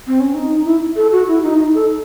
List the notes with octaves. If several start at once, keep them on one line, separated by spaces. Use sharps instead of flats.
C4
C#4
D#4
E4
A4
F#4
E4
D#4
D#4
A4